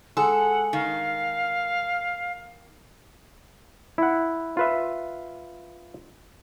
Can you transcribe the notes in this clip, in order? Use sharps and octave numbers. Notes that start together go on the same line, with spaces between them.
G#3 A4 F#5
D#3 F5
E4 F#5
F4 B4 E5